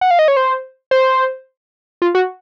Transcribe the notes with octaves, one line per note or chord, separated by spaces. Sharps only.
F#5
F5
D#5
C#5
C5
C5
F4
F#4